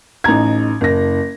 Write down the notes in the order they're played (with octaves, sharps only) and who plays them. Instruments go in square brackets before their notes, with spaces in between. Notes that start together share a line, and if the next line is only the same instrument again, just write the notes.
[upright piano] A1 D#4 A#5 G#6
F#1 A#6